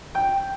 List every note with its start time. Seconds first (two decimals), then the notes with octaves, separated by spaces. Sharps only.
0.15 G5